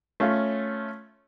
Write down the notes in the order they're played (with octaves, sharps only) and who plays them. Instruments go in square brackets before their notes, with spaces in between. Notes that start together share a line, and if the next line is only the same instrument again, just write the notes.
[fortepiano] A3 C#4 F4